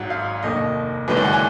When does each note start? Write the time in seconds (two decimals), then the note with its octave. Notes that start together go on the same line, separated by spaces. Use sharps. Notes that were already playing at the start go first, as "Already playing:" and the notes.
Already playing: G#1 G#2 F#3 F#5
0.10 F5
0.43 F1 D#2 D#3 D#5
1.08 F#1 F#2 D#3 G#3 B4
1.17 D5
1.25 F#5
1.33 G#5